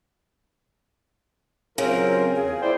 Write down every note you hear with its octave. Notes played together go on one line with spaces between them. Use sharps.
C#3 F#3 C4 F4 A#4
E2 G#4
E4 C5 D5 G5